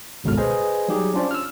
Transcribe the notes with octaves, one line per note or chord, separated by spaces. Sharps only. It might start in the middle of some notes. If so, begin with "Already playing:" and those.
G#1 C#2 G2 B2 A4 F6
G#4 B4 C5 D#5 G#5
F#3 G3 D#4 G4 G#4
C#4 D4 F4 C5 D5
E6 F6